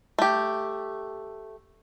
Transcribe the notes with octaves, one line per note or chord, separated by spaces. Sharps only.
A3 G4